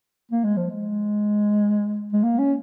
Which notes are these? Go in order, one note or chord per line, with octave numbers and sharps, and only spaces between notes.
A#3
G#3
F3
G#3
G#3
A#3
C#4